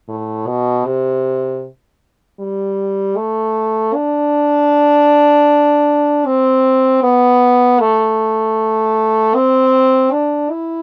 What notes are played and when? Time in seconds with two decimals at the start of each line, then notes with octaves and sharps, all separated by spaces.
0.08 A2
0.46 B2
0.85 C3
2.39 G3
3.17 A3
3.94 D4
6.26 C4
7.03 B3
7.80 A3
9.35 C4
10.12 D4
10.50 E4